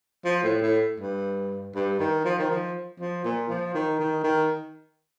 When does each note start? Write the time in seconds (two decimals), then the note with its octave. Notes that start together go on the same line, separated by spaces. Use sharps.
0.25 F3
0.43 A2
0.62 A2
1.00 G2
1.75 G2
1.99 D#3
2.25 F3
2.39 D#3
2.50 F3
3.00 F3
3.24 A#2
3.49 F3
3.75 D#3
3.99 D#3
4.24 D#3